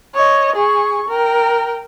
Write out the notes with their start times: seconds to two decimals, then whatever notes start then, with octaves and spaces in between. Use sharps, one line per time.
0.15 C#5 D#5
0.56 G#4 C#6
1.08 A#4 G5